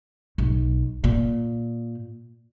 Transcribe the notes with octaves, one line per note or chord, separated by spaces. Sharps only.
B1
A#2